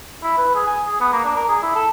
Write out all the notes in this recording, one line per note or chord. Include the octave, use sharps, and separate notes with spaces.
E4
B4
G#4
G#5
G#4
B3
A#3
D4
A#4
G#4
E4
A4